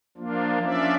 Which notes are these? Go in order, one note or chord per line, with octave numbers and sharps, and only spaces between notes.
F3 A#3 D4 F4
C#4 D4 F4 D5 E5